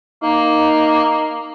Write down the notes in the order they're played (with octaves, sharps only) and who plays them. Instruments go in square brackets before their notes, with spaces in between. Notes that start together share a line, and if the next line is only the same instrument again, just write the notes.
[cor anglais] A#3 [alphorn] D#4